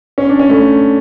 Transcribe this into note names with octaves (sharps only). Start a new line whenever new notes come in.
C#4
D4
C#4
A3